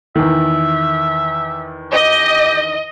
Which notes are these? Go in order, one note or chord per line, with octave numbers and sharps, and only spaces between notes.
E2 D#3 E5
G4 D#5